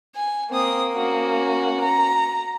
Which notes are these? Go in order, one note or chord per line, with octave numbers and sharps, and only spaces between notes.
G#5
A#3 C4 D#6
C#4 F#4
A#5